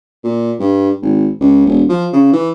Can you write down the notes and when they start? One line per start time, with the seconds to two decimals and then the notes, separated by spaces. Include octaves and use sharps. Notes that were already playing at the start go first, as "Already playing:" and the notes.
0.24 A#2
0.60 G2
1.02 G#1
1.41 C#2
1.66 E1
1.89 F3
2.13 C#3
2.33 E3